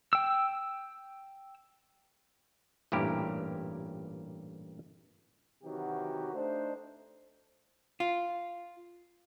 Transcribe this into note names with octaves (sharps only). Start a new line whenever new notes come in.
G5 E6
A1 G2 A#2 E4 G4 A#4
C3 D#3 E3 F#3 F#4 G4
A3 D4 D#4 C5
F4